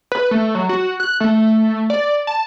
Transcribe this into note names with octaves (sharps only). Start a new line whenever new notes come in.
B4
A3
F#3
F#4
F#6
A3
D5
A5